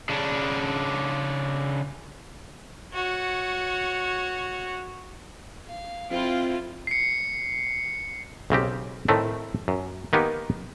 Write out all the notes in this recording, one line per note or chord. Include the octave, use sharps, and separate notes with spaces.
C#3 D4
F#4 C#5
F5
F2 C4 E4 F4
C7 C#7
B1 C#3 C4 G4
A2 D#3 A3 C4
F#2
D#3 A#3 B3 D#4 G4